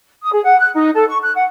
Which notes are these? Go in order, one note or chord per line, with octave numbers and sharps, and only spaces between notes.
D#6
G#4
F#5
F#6
D#4
A4
C#6
F#6
F#5